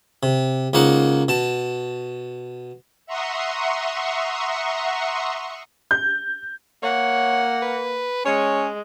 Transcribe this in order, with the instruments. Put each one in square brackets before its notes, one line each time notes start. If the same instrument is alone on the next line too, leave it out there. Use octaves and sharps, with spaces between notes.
[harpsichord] C3
C#2 A#3 D#4 C5 F#5
B2 A5
[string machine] E5 F#5 A#5 C6 C#6 D#6
[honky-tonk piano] G6
[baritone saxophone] A#3 [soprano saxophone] C#5 [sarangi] F#5
[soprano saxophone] B4
[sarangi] G#3 [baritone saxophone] C#4 [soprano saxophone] C#5